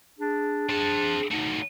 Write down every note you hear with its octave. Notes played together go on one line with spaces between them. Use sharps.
D4 G#4
C4 G#4 A5
F#3 A3 D#4